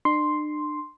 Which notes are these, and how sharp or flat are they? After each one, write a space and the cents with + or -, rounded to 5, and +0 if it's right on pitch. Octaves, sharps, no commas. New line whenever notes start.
D4 +40 C6 +0